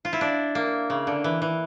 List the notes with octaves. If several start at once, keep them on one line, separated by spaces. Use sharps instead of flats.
F4
E4
D4
A#3
C#3
D3
E3
E3